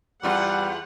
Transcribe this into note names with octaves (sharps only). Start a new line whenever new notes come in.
E2 G3 F4 F#5